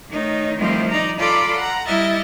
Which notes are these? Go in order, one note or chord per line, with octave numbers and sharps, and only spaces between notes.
D#3 A3 D#4 C#5
D#3 F3 G3 A3 C4 E4
D#4 D5 A#5
F4 A4 D5 A#5 B5 D6
F#5 A#5
G3 E4 D#5 E5 F6 A6